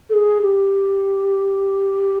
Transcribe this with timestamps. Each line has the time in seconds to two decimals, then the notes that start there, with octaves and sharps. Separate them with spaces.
0.10 A4
0.14 G#4
0.42 G4